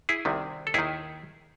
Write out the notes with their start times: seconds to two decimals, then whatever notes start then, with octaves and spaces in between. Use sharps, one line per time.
0.09 E4 G#4
0.25 C2 C3 D#3
0.67 A4
0.74 D#2 D#3 E4 G#4